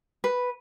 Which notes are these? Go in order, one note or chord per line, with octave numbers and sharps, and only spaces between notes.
B4